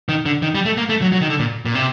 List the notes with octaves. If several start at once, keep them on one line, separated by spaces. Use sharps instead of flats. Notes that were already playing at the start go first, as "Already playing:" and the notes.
D#3
D3
D#3
G3
A3
A#3
A3
F#3
F#3
D#3
D3
A#2
A#2
C3